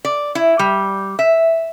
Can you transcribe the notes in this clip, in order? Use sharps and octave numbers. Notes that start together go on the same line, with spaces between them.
D5
E4
G3
E5